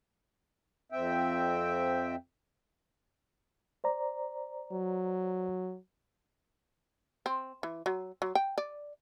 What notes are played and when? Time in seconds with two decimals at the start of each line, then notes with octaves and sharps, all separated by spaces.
0.92 F2 C4 E5 G5
3.84 C5 D5 A#5
4.72 F#3
7.26 C4
7.63 E3
7.86 F#3
8.22 F#3
8.35 G5
8.58 D5